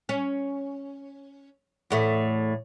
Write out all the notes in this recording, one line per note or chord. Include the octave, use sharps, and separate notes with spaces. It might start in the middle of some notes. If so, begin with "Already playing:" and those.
C#4
E2 A2 A3